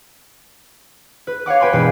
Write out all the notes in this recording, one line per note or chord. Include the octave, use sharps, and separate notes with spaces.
B4
C#5 F5 F#5 D6
B4 G5 G#5 B5 C6
E1 B4 C7